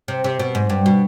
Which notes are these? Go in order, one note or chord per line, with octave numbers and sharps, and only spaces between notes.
C3
C3
B2
G#2
G2
B2